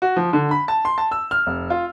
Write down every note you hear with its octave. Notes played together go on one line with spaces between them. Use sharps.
F#4
F3
D3
B5
A5
C6
A5
E6
F6
F1
F4